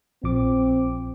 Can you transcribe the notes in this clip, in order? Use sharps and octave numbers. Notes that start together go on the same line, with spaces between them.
A#1 F3 C4 D6